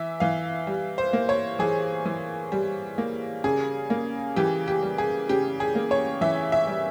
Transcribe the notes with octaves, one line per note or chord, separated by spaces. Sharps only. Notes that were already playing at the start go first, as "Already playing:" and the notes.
Already playing: E3 E5
E3 F5
G3
C5
A#3
C#5
E3 G#4
E3
G3
A#3
C#3 G#4
A#3
E3 G4
G4
G3
G#4
C#3 G4
G#4
A#3
C#5
E3 E5
E5
G3